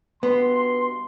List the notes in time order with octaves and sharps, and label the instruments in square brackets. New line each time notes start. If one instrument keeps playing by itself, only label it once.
[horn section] G2 B2 C6 [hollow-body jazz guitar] B3